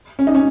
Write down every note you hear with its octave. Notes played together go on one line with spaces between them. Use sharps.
C#4
D#4
C#4